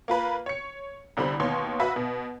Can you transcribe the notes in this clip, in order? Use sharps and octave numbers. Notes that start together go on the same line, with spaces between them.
A#3 F4 B4 A#5
C#5 C#7
C2 D3 G3 C5 B5
D#2 B2 C#5 C6
B1 F#4 B4 E5
B2